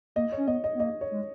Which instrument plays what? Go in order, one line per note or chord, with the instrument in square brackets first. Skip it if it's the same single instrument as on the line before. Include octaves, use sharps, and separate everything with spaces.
[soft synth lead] A#3 [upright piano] D#5
[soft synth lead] C#4 [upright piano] C#5
[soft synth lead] B3 [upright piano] D#5
[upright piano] D#5
[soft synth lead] B3
[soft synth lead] A#3 [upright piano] D#5
[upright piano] C#5
[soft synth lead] G#3